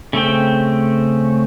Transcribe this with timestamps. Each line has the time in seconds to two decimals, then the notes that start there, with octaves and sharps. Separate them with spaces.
0.13 C#3 A3 C4 G5